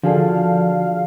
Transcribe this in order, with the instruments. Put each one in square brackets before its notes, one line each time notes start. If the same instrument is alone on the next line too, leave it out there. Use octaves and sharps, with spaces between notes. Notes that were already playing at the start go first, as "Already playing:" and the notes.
[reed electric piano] D3 F#4 G#4 [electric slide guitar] F3 [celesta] A4 D5 A5 [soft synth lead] F5